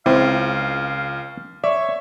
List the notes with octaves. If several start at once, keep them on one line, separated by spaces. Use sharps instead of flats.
C#2 C4 E4 F5
C#5 D5 E5